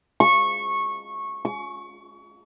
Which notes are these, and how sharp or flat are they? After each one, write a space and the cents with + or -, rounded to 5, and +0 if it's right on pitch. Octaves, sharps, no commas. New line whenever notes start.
C#6 -15
C#6 +30